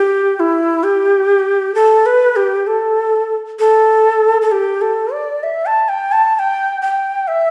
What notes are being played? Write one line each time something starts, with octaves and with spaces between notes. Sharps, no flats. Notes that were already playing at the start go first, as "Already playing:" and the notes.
Already playing: G4
G4
E4
G4
A4
B4
G4
A4
A4
A4
G4
A4
D5
E5
A5
G5
A5
A5
G5
G5
E5